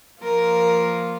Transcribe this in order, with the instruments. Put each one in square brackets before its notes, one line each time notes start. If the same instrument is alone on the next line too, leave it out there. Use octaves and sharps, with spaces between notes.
[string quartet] F3 A#3 F4 A#4